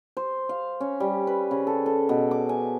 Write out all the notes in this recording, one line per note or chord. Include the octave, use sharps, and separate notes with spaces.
C5
F5
C#4
G3
B4
C#3
A4
A4
B2
D6
G#5